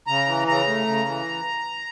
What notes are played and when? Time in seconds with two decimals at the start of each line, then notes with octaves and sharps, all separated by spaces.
0.07 C#3 A#5
0.27 E3
0.48 C#3 A#5
0.67 A3
0.87 C#3
1.06 E3